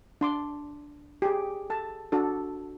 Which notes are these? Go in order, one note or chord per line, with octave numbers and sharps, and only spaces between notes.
D4 C6 D6
G4 G#4
A4 A5
D4 F#4 A4